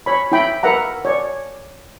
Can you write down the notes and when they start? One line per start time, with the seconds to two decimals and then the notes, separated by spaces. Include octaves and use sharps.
0.06 C#5 B5
0.32 E4 G5 B5
0.63 A#4 B4 E5 F#5 A#5
1.05 C#5 D5